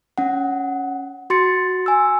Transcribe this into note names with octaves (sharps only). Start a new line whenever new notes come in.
C#4 F#5
F#4 C6 A6 C#7
G#5 E6